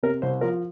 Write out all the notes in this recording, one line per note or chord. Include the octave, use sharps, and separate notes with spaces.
C3 A#4
C2 C5
F3 A#4